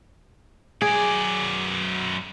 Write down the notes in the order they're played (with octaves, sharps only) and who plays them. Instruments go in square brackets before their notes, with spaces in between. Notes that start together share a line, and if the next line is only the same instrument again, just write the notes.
[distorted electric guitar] F#2 D5 [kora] G#4